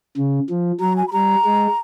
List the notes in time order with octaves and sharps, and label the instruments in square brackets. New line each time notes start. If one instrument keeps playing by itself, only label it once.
[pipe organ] C#3
F3
[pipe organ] F#3 [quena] A#5
[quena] G#5
B5
[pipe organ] G3 [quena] A#5
[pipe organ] G#3